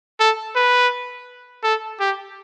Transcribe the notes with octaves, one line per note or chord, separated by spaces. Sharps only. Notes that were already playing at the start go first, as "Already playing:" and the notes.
A4
B4
A4
G4